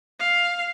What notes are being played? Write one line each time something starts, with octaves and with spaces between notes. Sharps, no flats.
F5